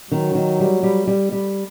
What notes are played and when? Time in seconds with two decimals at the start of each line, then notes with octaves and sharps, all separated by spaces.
0.11 D#3 F#3
0.35 D#3
0.60 G3
0.83 G3
1.07 G3
1.32 G3